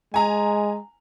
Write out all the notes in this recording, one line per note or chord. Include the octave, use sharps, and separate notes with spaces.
G#3 G#5 A#5